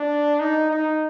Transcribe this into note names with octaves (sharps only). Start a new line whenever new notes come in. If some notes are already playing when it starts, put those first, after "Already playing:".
Already playing: D4
D#4
D#4